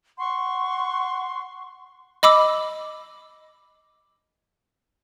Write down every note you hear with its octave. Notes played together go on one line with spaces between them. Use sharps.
F#5 C6 C#6
D#5 B5 D6 E6